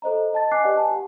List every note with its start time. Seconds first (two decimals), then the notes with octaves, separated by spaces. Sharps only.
0.02 A4 C5 D#5 A#5
0.33 D#5 A5 A6
0.51 D#5 G#5 D6 F#6 C7
0.64 G4 B4 D5 D#5 F#5
0.76 G#5 A5
0.91 G4 F#5